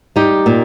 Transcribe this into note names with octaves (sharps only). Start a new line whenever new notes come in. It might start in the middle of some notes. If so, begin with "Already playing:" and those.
G3 D#4 G4
A#2